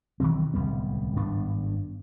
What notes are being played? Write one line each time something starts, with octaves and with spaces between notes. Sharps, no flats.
B1 D#3 E3 C4
D1 C2 G3 B3
G#1 G2 B3 D4